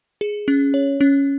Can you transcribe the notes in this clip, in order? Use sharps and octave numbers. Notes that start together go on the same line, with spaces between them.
G#4
C#4
C#5
C#4